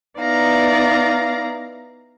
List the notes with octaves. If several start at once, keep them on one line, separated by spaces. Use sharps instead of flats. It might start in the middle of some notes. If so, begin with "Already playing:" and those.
B3 D#4 E4 D5 F5 A#5